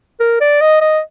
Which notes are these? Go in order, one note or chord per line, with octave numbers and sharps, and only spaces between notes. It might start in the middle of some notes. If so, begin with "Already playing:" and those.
A#4
D5
D#5
D#5